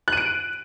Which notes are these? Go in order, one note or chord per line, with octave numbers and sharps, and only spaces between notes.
F#6 D7 D#7